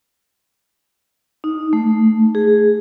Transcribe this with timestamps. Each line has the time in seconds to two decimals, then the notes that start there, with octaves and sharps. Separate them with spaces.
1.44 D#4
1.73 A3
2.35 G#4